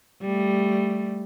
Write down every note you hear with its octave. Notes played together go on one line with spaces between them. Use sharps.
G3 A3